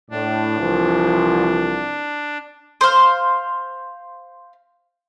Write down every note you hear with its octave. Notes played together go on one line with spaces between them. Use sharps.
A2 D4
C2 E3 F3
C5 F5